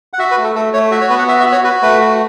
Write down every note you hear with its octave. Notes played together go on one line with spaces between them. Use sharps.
F#5
F#4 E5
B4
A3
A4
A3 A4
A3 C#5
F#4 E5
C#5
B3 B4
F#5
F#4 E5
E5
F#4
C#5
F#4 B4
A3 B4
F#4